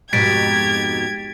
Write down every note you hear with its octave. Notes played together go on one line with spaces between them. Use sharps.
F2 G#2 B2 G4 G#6 A6 B6 D7